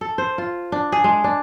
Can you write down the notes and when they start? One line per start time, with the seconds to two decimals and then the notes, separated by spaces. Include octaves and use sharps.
0.01 A4
0.18 C5
0.38 F4
0.72 D4
0.92 G#4
1.04 G#3
1.24 D4